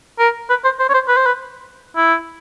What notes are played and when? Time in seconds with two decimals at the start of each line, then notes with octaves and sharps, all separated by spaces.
0.19 A#4
0.50 B4
0.64 C5
0.79 C5
0.89 C#5
0.94 C5
1.08 B4
1.17 C5
1.26 B4
1.96 E4